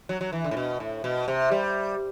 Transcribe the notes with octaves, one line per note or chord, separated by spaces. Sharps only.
F#3
F#3
E3
D3
A2
B2
A2
B2
C3
G3